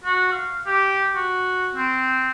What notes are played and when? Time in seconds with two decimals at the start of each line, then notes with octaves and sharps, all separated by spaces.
0.04 F#4
0.32 F5
0.66 G4
1.15 F#4
1.75 C4